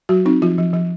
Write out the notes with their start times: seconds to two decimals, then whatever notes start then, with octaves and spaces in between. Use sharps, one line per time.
0.09 F#3 F#4
0.26 C4 D#4
0.42 F3 F4
0.58 F3
0.73 F3